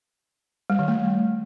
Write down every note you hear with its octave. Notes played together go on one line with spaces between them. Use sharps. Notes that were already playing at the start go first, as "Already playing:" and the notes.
G3
D#3
A3